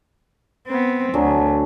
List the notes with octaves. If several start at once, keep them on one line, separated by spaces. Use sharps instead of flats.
B3 C4
D2 D3 F#3 G#4